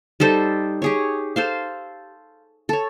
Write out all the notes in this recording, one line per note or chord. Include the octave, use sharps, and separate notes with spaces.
G3 D#4 A4 C5
G4 G#4 C#5
A4 C5 F5
A4 C#5